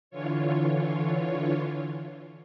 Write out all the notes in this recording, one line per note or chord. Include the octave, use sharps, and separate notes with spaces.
D3 E3 F4 C#5